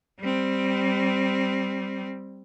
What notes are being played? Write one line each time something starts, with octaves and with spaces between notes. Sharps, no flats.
G3 C4